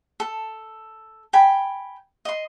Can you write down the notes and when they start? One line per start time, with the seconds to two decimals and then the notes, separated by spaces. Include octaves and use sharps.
0.20 A4
1.33 G5 G#5 B5
2.25 D#5 C6